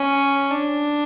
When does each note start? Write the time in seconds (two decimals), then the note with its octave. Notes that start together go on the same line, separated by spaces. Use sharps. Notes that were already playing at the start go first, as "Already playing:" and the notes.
Already playing: C#4
0.51 D4